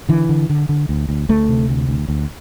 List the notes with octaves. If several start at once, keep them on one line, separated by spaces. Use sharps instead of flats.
D3 E3
D3
D3
D3
D2
D2
D2 A3
C3
D2
D2
D2